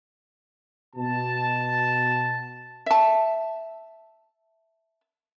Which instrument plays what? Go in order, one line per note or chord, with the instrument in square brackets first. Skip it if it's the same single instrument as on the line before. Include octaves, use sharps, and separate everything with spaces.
[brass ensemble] B2 A5
[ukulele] E5 A5